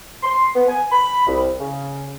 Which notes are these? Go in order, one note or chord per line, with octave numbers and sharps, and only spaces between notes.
C6
B3
G#5
B5
C2
C#3